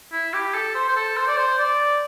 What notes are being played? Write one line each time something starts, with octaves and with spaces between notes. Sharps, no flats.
E4
G4
A4
C5
C5
A4
C5
D5
C5
D5